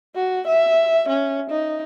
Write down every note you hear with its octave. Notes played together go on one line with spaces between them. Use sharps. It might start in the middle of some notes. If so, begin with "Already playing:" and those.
F#4
E5
C#4
D#4